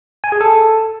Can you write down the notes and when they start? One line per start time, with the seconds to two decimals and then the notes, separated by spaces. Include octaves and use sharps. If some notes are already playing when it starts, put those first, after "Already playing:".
0.24 G#5
0.32 G#4
0.41 A4